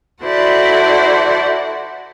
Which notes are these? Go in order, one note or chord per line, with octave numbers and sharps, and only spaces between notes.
E4 F#4 A4 C5 D5 F#5